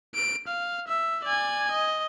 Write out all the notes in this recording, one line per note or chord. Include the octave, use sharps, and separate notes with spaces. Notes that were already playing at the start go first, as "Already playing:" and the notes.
D7
F5
E5
D5 G#5
D#5